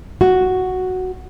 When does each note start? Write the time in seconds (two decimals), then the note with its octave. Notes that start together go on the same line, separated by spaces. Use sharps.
0.21 F#4